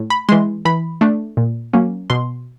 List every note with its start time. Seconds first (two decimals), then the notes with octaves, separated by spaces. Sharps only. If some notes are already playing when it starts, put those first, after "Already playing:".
Already playing: A2
0.10 B5
0.29 E3 G#3 C6
0.65 E3 B5
1.01 A3 D4
1.37 A#2
1.73 F#3 A#3 C#4
2.10 B2 C6